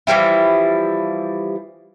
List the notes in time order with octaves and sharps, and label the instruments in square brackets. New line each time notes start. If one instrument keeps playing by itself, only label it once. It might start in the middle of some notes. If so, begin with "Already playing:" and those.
[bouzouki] E3 F3 G3 E4